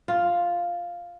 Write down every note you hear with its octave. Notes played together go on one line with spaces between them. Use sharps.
F4